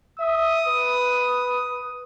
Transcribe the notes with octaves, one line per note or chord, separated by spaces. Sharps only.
E5 D#6
B4